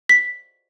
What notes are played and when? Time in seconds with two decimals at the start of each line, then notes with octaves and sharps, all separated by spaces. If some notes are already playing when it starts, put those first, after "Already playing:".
0.09 B6